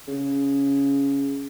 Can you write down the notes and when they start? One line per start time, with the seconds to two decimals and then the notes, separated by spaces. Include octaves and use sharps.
0.08 C#3